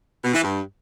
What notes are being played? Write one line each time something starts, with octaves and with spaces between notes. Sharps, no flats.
B2
E3
G2